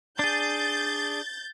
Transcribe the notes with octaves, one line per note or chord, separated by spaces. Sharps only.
D4 G#4 G6 A6